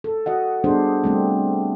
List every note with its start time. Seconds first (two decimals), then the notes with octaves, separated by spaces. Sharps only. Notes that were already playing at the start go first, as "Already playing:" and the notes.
0.04 A4
0.26 F#4 D#5 F#5
0.64 G3 B3 D4 G#4 C5
1.04 G3 A3 C4